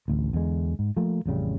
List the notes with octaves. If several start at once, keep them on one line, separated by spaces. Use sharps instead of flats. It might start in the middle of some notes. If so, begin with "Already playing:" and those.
A1 D2
E2 D3 G#3
G#2
F3 A3 A#3
A1 F2 C#3 G3